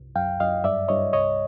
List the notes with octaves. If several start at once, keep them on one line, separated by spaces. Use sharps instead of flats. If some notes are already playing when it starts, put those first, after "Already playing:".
Already playing: C2
F#2 F5 G5
F#2 D#5 F5
G2 D5 E5
G2 C#5 D#5
C2 C#5 D#5